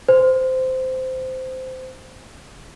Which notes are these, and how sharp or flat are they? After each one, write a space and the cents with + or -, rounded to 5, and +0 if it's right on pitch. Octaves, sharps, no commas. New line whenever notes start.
C5 -15